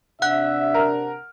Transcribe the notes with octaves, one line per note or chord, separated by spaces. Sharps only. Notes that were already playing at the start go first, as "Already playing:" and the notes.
C3 D4 E5 F#5 F#6
A#4 F6